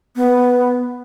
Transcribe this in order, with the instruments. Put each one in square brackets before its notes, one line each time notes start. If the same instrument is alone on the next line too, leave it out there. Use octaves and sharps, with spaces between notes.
[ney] B3